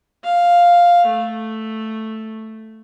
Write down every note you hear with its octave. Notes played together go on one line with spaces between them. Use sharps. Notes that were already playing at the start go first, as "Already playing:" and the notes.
F5
A3